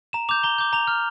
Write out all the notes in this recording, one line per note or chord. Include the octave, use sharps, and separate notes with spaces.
A#5 E7
D6 G6 F7
A#5 G7
D6 G6
A#5 F7
F6